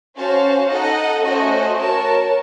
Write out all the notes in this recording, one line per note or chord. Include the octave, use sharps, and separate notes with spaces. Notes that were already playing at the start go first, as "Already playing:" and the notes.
C#4 F#4 C5 F5 A5
D#4 A4 D#5 F#5
A3 C#4 F#4 C5 D#5
F#4 A#4 C#5 A5